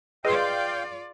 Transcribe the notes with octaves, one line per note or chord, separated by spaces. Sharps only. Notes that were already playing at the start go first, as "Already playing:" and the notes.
F4 G#4 B4 D5 D#5 F5 G5 C6